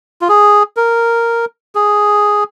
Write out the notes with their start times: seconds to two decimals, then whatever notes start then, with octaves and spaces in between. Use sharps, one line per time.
0.21 F4
0.29 G#4
0.77 A#4
1.75 G#4